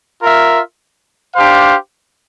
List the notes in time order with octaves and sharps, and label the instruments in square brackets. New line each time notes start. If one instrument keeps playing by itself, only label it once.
[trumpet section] F4 A#4 E5
D4 G4 C5 F5